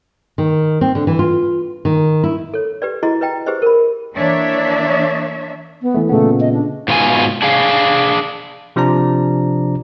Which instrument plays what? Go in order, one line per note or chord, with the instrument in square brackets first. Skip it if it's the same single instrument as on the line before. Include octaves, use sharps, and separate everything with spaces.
[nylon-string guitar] D#3
C4
D3
E3
F4
D#3
E4
[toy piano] A4 C#5
G4 B4 D5
E4 F#4 G#4 D#5 A#5
B4 D#5 G5 A#5
G4 G#4 B4 C5 D#5
A#4 B5
[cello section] E3 A#3 D4 C#5 E5
[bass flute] B3
[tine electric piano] E3 A3
[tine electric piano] A#2 C#3 B3 [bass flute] A3
[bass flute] D#5
D4
[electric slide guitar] G#2 B2 F4 A4 G#5
D4 G#4 F5
[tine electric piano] C3 F3 D4 D5 A#5